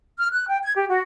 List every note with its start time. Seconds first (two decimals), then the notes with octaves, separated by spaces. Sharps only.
0.19 F6
0.32 F#6
0.49 G5
0.62 G#6
0.76 G4
0.89 F#4